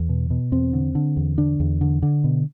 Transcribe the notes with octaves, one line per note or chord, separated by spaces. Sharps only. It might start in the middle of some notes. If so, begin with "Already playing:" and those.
Already playing: E2
B2
B2
E2 C4
D3
D3
E2
D3 D4
E2
D3
D3
B2